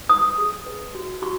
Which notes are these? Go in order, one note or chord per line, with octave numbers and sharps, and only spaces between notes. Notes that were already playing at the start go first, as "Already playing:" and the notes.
B4 D#6
G#4
B4
F#4
F#4 C#6